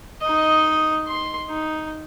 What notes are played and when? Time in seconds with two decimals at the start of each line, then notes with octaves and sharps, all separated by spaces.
0.22 D#4 D#5
1.08 C6
1.49 D#4